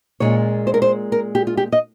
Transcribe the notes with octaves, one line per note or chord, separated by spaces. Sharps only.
A#2 G#3 C#4 F4 C#5
C5
A#4
C5
A#4
G4
F4
G4
D#5